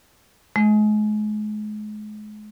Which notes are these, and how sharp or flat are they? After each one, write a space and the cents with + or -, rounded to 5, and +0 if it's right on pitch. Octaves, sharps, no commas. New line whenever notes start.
G#3 +35